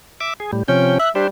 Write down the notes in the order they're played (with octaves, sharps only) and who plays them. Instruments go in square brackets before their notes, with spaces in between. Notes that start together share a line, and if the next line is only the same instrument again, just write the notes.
[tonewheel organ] E5 D6
G#4
A2 G3
[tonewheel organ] C3 F3 G5 [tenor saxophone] C#4
[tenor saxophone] E5 [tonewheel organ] F#6
[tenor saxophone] G3 [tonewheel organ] D4 G4 C5